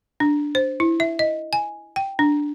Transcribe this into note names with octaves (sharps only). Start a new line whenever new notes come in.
D4
C5
E4
E5
D#5
G#5
G5
D4